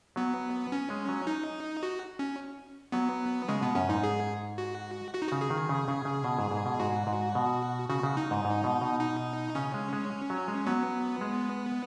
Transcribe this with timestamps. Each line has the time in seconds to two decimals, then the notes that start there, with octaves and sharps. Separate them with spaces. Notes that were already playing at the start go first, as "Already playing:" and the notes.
0.16 F#3 B3
0.72 C#4
0.90 G#3
1.09 F#3
1.27 D#4
1.83 F#4
2.19 C#4
2.92 F#3 B3
3.48 C#3 G#3
3.61 B2 B3
3.75 F#2 C#4
3.89 G#2 D#4
4.03 G#4
4.58 F#4
5.14 F#4
5.22 D#4
5.29 C#3 F#4
5.41 G#4
5.50 D#3
5.69 C#3
5.88 C#3
6.05 C#3
6.25 B2
6.39 G#2
6.51 G#2
6.66 B2
6.80 G#2 F#4
7.07 G#2
7.35 B2
7.89 C#3 F#4
8.03 C#3
8.17 D#4
8.31 G#2
8.45 G#2
8.64 B2
8.81 B2
9.00 D#4
9.55 C#3 C#4
9.74 G#3
9.93 G#3
10.30 F#3
10.48 G#3
10.66 F#3 B3
11.21 G#3